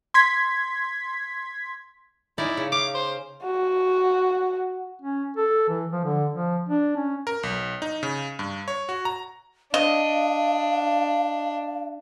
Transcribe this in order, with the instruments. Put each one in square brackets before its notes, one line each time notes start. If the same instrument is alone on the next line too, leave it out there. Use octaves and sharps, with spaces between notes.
[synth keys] C6 G#6 B6
[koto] C#4 D#4 D5 [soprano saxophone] E4
[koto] C#3
[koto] F5 [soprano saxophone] D6
[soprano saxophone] C5
[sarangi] F#4
[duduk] C#4
A4
E3
F3
D3
F3
D4
C#4
[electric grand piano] A#4
B1
D#4
C#3
G2
C#5
F#4
A#5
[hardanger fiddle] D4 [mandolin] D#5 [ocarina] F5